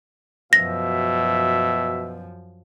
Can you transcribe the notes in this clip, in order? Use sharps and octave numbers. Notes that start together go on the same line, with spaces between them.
F#2 B2 F3 E5 A#6